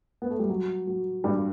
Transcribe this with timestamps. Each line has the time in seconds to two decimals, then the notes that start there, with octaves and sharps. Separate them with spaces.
0.22 B3
0.30 A3
0.39 G3
0.49 F#3
0.87 F#3
1.24 G2 G3